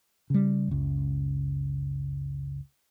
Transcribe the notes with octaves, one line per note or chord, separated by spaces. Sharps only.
C#3 G3
F#1 C#2